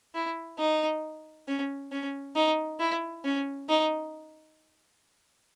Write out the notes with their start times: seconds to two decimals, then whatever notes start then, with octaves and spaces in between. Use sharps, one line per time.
0.15 E4
0.58 D#4
1.48 C#4
1.92 C#4
2.36 D#4
2.80 E4
3.25 C#4
3.69 D#4